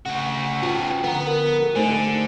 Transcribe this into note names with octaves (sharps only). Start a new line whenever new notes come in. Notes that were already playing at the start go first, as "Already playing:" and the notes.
C#3 A3 F#4
B3 C#4 F4 F#4 G5 A5
D3 F3 B3 B4 F#5 A#5
A#4
F#4 A4
D3 A3 D#4 G4 C5 G#5